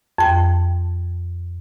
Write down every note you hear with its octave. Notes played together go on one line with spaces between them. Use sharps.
F2 G5